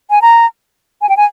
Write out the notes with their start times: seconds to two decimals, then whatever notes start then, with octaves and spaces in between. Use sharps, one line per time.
0.10 G#5
0.22 A#5
1.02 G#5
1.09 G5
1.17 G#5